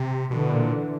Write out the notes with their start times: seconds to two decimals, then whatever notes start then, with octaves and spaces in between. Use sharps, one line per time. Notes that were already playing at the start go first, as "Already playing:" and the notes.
Already playing: C3
0.30 B2 D3 E3
0.52 A#2